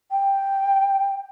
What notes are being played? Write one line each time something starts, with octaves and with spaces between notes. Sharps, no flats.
G5